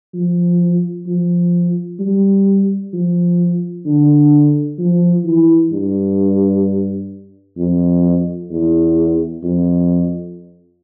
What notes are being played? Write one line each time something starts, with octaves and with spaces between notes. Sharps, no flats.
F3
F3
G3
F3
D3
F3
E3
G2
F2
E2
F2